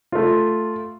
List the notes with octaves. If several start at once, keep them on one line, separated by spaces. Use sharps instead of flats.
A3 F4